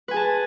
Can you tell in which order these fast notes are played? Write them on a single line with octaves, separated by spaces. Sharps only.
B4 G#5 G#4 A5